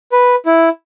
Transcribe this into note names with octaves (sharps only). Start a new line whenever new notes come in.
B4
E4